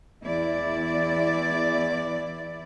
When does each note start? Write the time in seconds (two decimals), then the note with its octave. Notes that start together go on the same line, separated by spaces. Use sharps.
0.23 E2 E4 D5